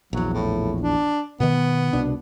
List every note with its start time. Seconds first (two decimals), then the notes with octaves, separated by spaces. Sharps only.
0.13 A#1 E2 F#3
0.33 A2
0.81 D4
1.40 B2 D#3 B3
1.93 C2 B2 D4